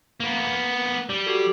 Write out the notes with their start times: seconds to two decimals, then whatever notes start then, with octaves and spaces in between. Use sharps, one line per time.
0.20 A#3 B3
1.09 G3 D5
1.26 F#4 G4 A4